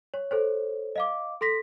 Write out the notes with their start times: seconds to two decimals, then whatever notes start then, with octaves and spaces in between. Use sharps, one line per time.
0.14 C#5
0.31 A4 C5 C#5
0.96 D#5 F5 D6
1.41 A4 C6 A#6 B6